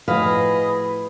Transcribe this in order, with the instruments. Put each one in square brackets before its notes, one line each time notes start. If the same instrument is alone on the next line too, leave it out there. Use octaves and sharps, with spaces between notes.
[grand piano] A2 F3 F#4 [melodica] G#4 D#5 [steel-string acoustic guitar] B4 [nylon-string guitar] F5